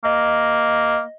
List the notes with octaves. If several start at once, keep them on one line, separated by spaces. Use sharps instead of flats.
A#3 D#5